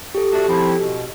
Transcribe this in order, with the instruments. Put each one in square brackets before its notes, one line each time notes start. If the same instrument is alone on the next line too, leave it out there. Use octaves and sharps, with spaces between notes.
[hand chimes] G4 A4
[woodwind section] A3 D4 F#4
F3 C4 E4
B2